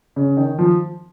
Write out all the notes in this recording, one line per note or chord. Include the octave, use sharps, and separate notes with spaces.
C#3
D#3
F3